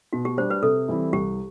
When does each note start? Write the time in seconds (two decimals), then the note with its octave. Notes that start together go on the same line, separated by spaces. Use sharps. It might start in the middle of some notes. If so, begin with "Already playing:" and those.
0.13 B2 F#4
0.25 G4
0.37 G3 D4 C5
0.50 B4
0.62 C3 A4
0.88 E3 G3 C4 E4
1.13 C2 G4